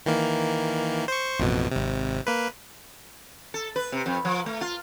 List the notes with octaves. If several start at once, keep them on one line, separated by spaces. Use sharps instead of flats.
D#3 E3 A#3
C5 C#6
A1 F2 B2
G#1 C3
A#3 B4
A4
B4
C3
F2
F3
A3
F4